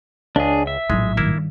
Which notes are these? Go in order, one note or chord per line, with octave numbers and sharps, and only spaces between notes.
C#2 D4 G#4
E5
A#1 A2 F#3 G#3 A3 E4
G2 D#3 A#3 E4